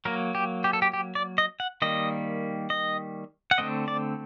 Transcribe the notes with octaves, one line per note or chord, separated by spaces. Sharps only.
F#3 A#3 A#4
G4
G4
A4
G4
G4
D5
D#5
F#5
D#3 G3 A#3 D#5
D#5
F#5
D3 A3 C4 D#5
D5